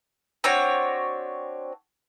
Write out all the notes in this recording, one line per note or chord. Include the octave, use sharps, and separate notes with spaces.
C4 D4 F#4 C#5